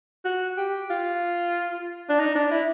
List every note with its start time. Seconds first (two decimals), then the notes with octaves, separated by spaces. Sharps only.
0.25 F#4
0.57 G4
0.90 F4
2.09 D4
2.19 D#4
2.35 D4
2.51 E4